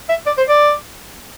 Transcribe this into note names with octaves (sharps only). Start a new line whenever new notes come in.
E5
D5
C5
D5